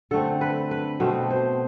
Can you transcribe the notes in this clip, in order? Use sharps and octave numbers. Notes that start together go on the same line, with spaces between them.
D3 A3 C4 A4
B4
B4
B2 A3 C4 C5
C5